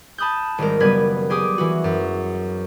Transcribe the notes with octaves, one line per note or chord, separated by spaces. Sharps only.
A5 B5 D#6 F#6 G6
G#1 G3 G#3 A#4
F#1 G3 B3 B4 G#6
G4 G#4 D6 D#6
E3 F#4
F#2